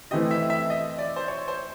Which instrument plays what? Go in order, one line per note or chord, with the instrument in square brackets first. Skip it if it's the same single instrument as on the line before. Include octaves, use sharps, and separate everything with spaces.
[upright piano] E3 A3 C4 E4 G4 [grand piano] D#5
[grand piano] E5
E5
D#5
D5
C5
C#5
C5